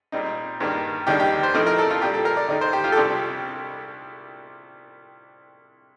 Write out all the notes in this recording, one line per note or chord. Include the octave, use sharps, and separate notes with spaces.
A#2 G3 C4 D#4
G2 D#3 G3 A#3
D#2 D#3 G3 D4 G4
G4
C5
A2 F3 A3 C4 D#4 A#4
A#4
A4
F4
A#2 G3 D4 G4
A4
A#4
D5
D#2 D#3 A3 D#4 D5
C5
G4
F4
A4
C2 C3 G3 D4 G4